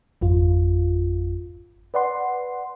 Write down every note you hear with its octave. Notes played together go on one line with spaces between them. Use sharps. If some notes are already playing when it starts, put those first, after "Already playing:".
G#1 F2 F4
B4 D5 F#5 C6